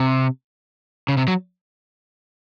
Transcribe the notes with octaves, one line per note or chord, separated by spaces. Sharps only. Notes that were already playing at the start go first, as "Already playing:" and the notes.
Already playing: C3
C#3
C3
F#3